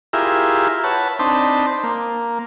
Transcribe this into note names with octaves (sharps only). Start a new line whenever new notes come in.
E4 F4 G4 G#4 A#4 E5
B4 C#5 F#5 A5
C4 D4 D#4 C5 A5 B5
A#3